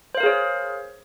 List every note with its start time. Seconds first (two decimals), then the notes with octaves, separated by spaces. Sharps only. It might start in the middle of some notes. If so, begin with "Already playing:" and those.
0.15 C5
0.17 F5
0.20 A#4
0.23 G#4
0.26 C#5